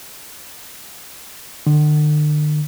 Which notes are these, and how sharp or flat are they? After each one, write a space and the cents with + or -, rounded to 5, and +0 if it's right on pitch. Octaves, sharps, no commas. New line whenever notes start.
D3 +40